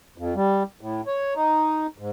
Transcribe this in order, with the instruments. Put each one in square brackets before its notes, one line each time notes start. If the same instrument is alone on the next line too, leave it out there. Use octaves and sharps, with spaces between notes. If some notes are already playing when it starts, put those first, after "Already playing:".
[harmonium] F2
G3
A2
C#5
D#4
G#2